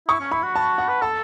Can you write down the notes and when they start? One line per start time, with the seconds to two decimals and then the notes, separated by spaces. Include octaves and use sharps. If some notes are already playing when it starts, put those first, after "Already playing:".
0.08 E4 C#6
0.20 C#4
0.31 E4 B5
0.43 F#4
0.55 A5
0.78 F#5
0.89 B4
1.02 A4 A5